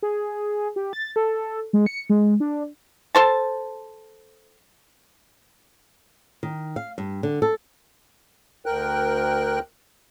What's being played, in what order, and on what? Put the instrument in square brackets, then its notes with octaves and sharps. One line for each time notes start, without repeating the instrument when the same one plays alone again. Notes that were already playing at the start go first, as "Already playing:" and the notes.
[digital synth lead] G#4
G4
A6
A4
G#3
C#7
G#3
D4
[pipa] A4 C5 A5
[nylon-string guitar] D#3
F5
G2
D3
A4
[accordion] D2 A#4 G5 F#6